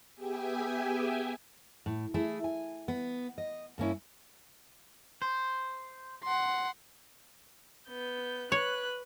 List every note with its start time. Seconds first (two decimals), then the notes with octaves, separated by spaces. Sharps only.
0.15 B3 G4 G#4 E5 G5 G#5
1.86 A2
2.14 A3 E4 G#4
2.44 G#5
2.88 B3
3.38 D#5
3.78 G2 A#3 C#4 E4
5.22 C5
6.24 F#5 C6
7.89 B3 G6
8.52 B4 C#5 F#6